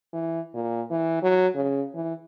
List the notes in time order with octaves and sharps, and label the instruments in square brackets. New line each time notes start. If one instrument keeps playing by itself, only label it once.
[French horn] E3
A#2
E3
F#3
C#3
E3